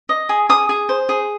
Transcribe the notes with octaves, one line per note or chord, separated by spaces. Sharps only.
D#5
G#4
G#4 D#6
G#4
C5
G#4